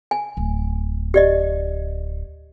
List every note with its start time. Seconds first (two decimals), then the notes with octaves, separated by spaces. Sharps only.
0.11 G#5
0.37 D1
1.14 G4 D5 D#5